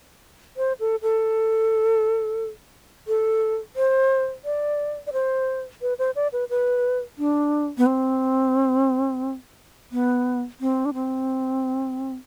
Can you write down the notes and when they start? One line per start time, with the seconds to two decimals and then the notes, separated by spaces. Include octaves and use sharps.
0.57 C5
0.80 A4
1.02 A4
3.08 A4
3.76 C5
4.45 D5
5.07 D5
5.13 C5
5.82 B4
5.99 C5
6.16 D5
6.33 B4
6.50 B4
7.18 D4
7.78 B3
7.86 C4
9.92 B3
10.61 C4
10.85 D4
10.94 C4